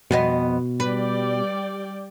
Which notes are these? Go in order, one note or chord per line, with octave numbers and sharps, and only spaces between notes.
F2 B2 B3 D#5
G3 B4 D5 G5